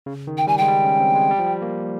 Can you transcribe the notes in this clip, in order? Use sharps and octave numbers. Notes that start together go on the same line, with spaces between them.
C#3
D#3
G5
G3 G#5
G#3 G5
G3
C#4
C4
G#3
G3
F3
G3
A#3